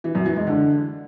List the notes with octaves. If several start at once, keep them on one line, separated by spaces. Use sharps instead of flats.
E3
F#2
E3
G#3
D3